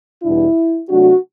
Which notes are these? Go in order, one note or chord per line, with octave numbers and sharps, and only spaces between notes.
E2 B2 G3 D4 E4
C3 F#3 A3 D4 F#4